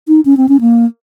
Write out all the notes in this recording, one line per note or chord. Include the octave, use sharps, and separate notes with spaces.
D#4
C#4
C4
C#4
A#3